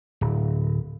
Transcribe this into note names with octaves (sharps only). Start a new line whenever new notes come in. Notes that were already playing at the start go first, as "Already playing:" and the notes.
D1